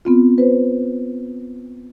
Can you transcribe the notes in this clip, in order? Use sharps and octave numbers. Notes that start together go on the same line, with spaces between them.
B3 C4 F4
B4 C5